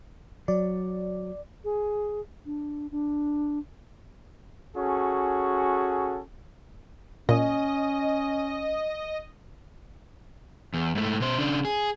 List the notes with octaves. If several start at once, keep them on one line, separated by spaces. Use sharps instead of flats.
F#3 D5
G#4
D4
D4
C#4 F#4 G#4 A4
A#2 C#4 D#5
E2
G#2 A3
B2 C5
C#3 D4
G#4